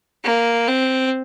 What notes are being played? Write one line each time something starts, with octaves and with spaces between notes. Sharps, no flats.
A#3
C4